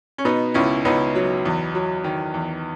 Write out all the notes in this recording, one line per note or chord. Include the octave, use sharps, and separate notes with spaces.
C#4
B2 B3 D#4
C#2 C#4 E4
C#2 B3 D#4
F#3
E2
F#3
D#3
E2